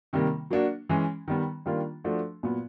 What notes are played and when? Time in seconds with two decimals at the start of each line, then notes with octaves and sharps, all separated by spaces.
0.13 C3 D#3 G3 A#3
0.50 F#3 A#3 D4 F#4
0.89 E3 G#3 C#4
1.28 D#3 G3 B3
1.66 D#3 G3 A#3 D4 F4
2.04 F3 A3 D4 F#4
2.43 A#2 F#3 B3